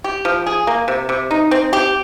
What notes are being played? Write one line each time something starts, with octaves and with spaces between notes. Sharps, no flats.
G4
F3
G#4
A#3
C3
C3
D#4
C4
G4